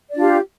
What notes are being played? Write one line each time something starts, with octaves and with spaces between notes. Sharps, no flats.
D4 F4 G4 D5